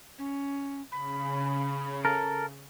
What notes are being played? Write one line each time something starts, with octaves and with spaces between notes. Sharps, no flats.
C#4
C#3 B5
A4 A#4